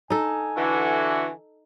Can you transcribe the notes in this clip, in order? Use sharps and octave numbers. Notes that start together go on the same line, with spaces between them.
D#4 A4 G#5
D3 E3 F#4